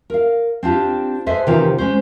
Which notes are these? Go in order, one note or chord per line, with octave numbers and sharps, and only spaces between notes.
A#4 F5
C4 D4 F4 G4
G#4 A4 B4 C5 D#5 E5
C3 D#3 E3 C4 F4 G4
G#3 C#4 C5